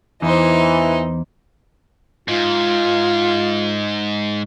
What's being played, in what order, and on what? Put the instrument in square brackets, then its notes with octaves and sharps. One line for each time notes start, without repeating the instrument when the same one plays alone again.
[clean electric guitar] E2 [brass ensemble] E3 [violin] D#4 C5
[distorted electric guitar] G#2 [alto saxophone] F4